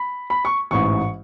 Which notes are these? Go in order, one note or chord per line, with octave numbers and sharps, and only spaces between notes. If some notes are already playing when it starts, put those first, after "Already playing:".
Already playing: B5
B5
C#6
A1 G#2 E3 C#6